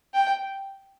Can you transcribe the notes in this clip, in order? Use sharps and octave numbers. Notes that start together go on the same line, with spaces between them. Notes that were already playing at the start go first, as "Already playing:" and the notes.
G5